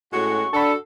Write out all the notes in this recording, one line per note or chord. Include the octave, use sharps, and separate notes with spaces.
A2 G#3 C#4 F#4 C#6
D4 F#4 A4 A5 B5